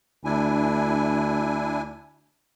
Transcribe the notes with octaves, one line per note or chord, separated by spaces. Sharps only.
D2 D4 E4 G#5